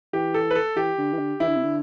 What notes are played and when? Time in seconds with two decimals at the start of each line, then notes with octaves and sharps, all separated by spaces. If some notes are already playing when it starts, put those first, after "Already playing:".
0.13 E3 G4
0.34 A4
0.51 B4
0.55 A4
0.76 E3 G4
0.98 D3
1.13 E3
1.19 D3
1.40 E3 E4
1.48 D3
1.56 C3
1.63 D3